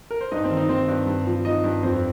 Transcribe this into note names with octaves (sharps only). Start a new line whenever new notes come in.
A#4
C5
G2 D#4 D#5
C4 C5
D#3
D#4 D#5
D#3 C4 C5
G2
G2
F3
F3 D#4 D#5
G2
F2 C4 C5